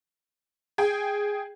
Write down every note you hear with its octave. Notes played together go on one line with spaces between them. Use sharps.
G#4 G5